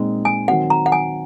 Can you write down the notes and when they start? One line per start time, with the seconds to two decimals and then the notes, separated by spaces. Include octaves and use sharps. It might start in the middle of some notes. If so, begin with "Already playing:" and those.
Already playing: A#2 G#3 C4 D#4
0.25 G#5
0.48 D#3 F#3 C4 F#5
0.70 A#5
0.86 F#5
0.92 G#5